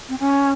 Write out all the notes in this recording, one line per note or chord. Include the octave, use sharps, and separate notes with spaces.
C4
C#4